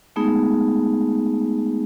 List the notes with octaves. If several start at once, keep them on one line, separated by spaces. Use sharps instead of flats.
G#3 A3 B3 D#4 G#4